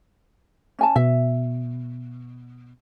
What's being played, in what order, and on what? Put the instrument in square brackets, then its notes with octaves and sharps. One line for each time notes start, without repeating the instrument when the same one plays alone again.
[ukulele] C#4 G#5 A5
[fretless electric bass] B2 [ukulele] E5